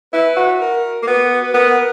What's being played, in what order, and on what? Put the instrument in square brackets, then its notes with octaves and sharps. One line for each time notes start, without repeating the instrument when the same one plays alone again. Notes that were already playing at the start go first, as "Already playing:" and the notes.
[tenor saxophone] E4 [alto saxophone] B4
[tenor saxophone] F#4
[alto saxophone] A#4
[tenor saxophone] A#3
[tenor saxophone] B3 [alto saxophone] F#4
[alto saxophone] B4
[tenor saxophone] B3 [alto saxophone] A#4